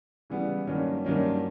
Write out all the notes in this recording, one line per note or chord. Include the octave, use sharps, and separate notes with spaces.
C#3 E3 G3 B3
G2 D#3 F#3 A#3 C#4
G2 D#3 F#3 A#3 C#4